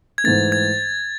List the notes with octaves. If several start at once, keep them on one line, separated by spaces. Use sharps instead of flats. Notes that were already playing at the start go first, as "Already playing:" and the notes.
G#6
G#2 E3 A3 A6
G#6